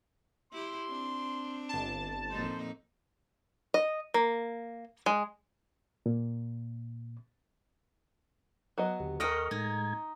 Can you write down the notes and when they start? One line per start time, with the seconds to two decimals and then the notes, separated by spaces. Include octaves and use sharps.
0.53 E4 G4 C6
0.89 C4 D4
1.69 G1 A5
2.30 F2 A#2 D#4 C5
3.74 D#5
4.14 A#3
5.06 G#3
6.06 A#2
8.78 F#3 B3 D#5
9.00 D#2 D3 G4
9.20 D#2 A4 A#4 D#5 F#5 G5 C#6 F6
9.51 A2 G#3 D#4 G#6